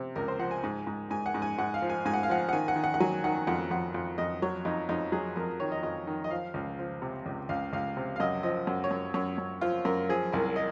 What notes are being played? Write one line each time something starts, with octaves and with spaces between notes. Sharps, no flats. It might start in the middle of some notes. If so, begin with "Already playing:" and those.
Already playing: C3
C#2 A#4
C5
F3 F#5
G#5
G#2
G#2
G#2 G#5
F#5
G#2
G#5
G#2 F#5
F5
F3
G#5
G#2 G#5
F#5
F5
F3 F#5
F#5
D#3 G#5
F#5
D#3
F#5
F#5
F#3 G#5
D#3 F#5
F2 F#5
F2 F#5
F2
F2 D#5
F#3 C#5
F2 D#4
F2 D#4
F#3 G#4
F2 A#4
D#3 C#5
D#5
F2 D#5
D#3
D#5
F3 F5
C#2
F3
C3
C#2
C#2 F5
C#2 F5
C3
F5
F#2 D#5
F3 D#5
F#2
C#5
F#2
F#2 C#5
F#2
F3 F4
F#2 A#4
F3 G#4
C2 A#4
D#5